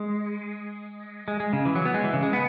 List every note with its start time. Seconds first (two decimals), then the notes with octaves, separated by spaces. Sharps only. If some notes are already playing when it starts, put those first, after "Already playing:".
Already playing: G#3
1.28 G#3
1.40 G#3
1.53 C#3
1.65 E3
1.75 F#3
1.85 B3
1.94 G#3
2.04 E3
2.13 C#3
2.23 G#3
2.33 B3